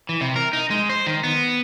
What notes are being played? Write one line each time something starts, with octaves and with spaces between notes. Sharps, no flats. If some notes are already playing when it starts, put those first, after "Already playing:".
E3
C3
A#4
D#4
G#3
C5
D#3
B3